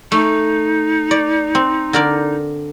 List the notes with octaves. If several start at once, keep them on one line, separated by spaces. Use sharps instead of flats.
A3 D#4
D5
C4
D3 A#4 D5